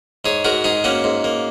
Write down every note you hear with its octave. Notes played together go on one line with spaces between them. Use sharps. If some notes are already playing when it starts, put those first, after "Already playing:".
G#2 G#4 C#5
G#2 F#4 A#4
G#2 D#4 G#4
A#3 C#4 F#4
G#2
A#3